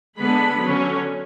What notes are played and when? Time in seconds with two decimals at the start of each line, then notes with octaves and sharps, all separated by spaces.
0.19 D3 G#3 B3 D4 B5
0.61 D3 F#3 C#4